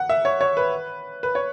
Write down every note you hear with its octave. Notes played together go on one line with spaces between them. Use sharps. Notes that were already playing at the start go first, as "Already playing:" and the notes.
Already playing: F#5
E5
C#5
C#5
B4
B4
C#5